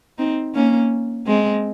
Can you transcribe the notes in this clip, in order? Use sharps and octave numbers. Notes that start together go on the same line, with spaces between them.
C4 D#4
A#3 C#4
G#3 C4